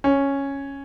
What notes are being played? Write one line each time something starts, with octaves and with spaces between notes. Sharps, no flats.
C#4